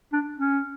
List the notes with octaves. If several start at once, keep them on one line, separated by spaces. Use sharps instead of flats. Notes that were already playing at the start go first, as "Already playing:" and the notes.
D4
C#4